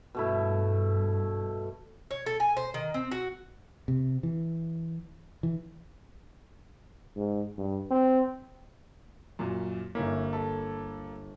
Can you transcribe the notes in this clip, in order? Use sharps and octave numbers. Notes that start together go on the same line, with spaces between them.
G2 B2 A3 E4
C#5
A4
G#5
C5
D#3
C4
F#4
C3
E3
E3
G#2
G2
C4
F#2 A#2
G1 A#3 C#4 E4 F6 B6
A4 E5 A5 B5